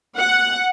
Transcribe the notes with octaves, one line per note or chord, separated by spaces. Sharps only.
F#5